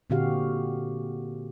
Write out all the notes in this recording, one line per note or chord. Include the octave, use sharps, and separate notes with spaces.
A#2 D3 C4 F#4 G4 F5